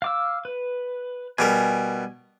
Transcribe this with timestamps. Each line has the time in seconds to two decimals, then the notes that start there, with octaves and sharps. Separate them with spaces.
0.02 F5 D6 E6
0.45 B4
1.39 B2 G3 A#4 G#5